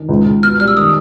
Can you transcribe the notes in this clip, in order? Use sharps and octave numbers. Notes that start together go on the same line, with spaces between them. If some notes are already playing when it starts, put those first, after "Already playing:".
Already playing: D#3
C#2
C#2
B2 F6
G3 F6
E6
D#3 D#6